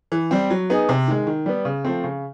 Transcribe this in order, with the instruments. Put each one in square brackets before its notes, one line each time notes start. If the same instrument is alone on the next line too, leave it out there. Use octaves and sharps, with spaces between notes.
[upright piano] E3
G3 C4
F#3
B3 D#4 G#4
C3
D#3 G#3
D#3
G3 B3
C#3
F3 A3 C4
C#3